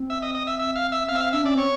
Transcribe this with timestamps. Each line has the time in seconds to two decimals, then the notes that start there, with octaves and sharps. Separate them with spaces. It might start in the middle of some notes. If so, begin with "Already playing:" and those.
Already playing: C4
0.10 E5
0.22 D#5
0.35 D#5
0.47 E5
0.59 E5
0.76 F5
0.92 E5
1.09 C4 F5
1.15 E5
1.21 F5
1.33 D4 E5
1.44 C#4 D5
1.55 C4 C#5